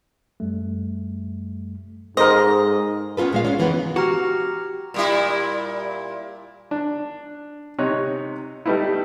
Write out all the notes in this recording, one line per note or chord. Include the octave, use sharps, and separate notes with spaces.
F#2 G3 A3
G#2 A4 A#4 C5 D#5
B3 C#4 F4 A4 B4
A#2 G#3 F5
C#4 F4
F#2 E3 G#3 B3
F#4 G4 A#5 F6
A#2 G3 E4
D4
C3 D#4 C#5 F#6
G3 A3 B3 D#4 E4